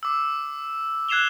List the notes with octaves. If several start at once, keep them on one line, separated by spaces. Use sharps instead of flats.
D6 E6
F#6 G#6 C7 E7 F7 G7